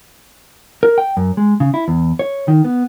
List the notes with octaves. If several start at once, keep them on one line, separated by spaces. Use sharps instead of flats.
A#4
G5
F#2
G#3
C#3
E4
E2
C#5
D#3
B3